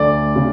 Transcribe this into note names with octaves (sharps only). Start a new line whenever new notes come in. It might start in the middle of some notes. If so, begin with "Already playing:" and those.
Already playing: D2 D5
C#3